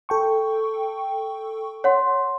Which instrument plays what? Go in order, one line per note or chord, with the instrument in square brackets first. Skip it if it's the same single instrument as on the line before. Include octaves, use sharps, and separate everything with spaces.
[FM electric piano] A4 G5 C#6
[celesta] C#5 F#5 C6